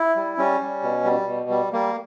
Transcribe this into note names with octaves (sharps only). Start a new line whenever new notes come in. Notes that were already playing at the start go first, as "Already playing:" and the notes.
Already playing: E4
G3
G3 C#4
G3
B2
G3
B2
G3
G3 A#3